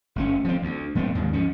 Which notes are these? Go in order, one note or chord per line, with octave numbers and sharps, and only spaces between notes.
G1 A3 C#4
F3 C4
D2
F#3 A3 B3 C4
D#2 G#2 D#3
F3 C#4